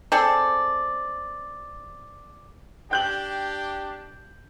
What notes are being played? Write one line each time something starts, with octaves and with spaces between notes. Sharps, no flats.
C4 G#4 A4 D5
D4 G4 G5 G6 F#7